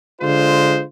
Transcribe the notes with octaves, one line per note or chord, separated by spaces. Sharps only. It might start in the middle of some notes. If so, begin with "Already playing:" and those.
D3 G#3 F4 C5